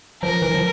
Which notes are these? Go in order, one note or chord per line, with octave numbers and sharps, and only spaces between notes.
F3 A#4
E3
F3